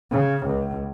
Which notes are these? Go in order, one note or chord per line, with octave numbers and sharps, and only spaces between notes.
C#3
C#2